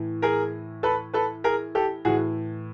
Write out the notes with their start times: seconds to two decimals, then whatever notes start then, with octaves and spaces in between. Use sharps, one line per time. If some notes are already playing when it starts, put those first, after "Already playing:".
Already playing: A2 E3
0.22 G#4 A#4
0.83 A4 B4
1.14 A4 B4
1.44 G#4 A#4
1.75 G4 A4
2.05 A2 E3 F#4 G#4